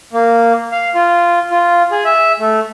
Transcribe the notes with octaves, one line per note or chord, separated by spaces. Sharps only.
A#3
F5
F4
F4
G#4
E5
A3